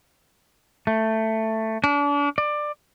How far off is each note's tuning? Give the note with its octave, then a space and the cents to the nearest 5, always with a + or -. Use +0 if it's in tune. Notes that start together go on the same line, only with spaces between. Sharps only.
A3 +10
D4 -35
D5 +20